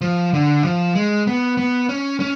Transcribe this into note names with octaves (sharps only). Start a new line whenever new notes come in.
F3
D3
F3
G#3
B3
B3
C#4
C#4